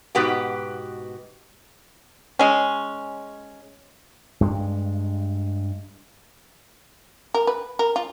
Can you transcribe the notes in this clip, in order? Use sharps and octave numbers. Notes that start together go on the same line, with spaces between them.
G#2 B2 B3 F#4 G4
G#3 C#4
G2 G#3
A#4
B4
A#4
F4